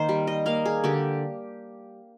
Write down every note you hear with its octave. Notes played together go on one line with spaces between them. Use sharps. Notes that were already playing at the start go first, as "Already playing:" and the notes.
Already playing: D#3 A#3 C5
G3
D#5
A#3 F5
G#4
D3 G4